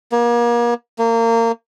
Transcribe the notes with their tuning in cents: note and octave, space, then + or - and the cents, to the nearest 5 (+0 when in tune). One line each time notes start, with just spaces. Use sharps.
A#3 +35
A#3 -25